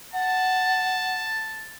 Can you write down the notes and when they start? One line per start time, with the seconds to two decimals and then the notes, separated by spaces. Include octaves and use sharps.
0.13 F#5 A5